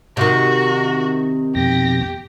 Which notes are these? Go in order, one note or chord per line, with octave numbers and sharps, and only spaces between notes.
C3 D#3 F#4
F2 B2 G4 A#6